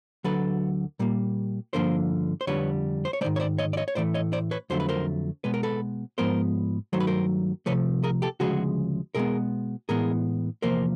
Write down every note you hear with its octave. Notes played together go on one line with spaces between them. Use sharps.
D2 D3 F#3 A4 B4
A#2 G3 A#3
G2 D3 F3 A#3 A#4 C5
C5
F2 D3 G3 B4 C#5
C5
C#5
G#3 C5 D5
G#2 D#3
C#5
C5 D5
C#5 D#5
D5
C#5 D#5
C#5
A2 E3 A3 C5 D5
C#5 D#5
C5 D5
B4 C#5
F2 D3 F#3 A3 C5
B4
A#4 C5
B2 G#3 B3 B4
A#4
A4 B4
G#2 F3 G#3 B3 A#4 C5
G2 D#3 F#3 A3 C5
B4
A#4 C5
C2 C3 F3 A3 B4 C#5
G#4 A#4
G4 A4
D2 C#3 F3 G#3 F#4 G#4
B2 G#3 B3 G#4 A#4
A2 E3 G#3 B3 G#4 A#4
E2 C3 F3 A#3 A#4 C5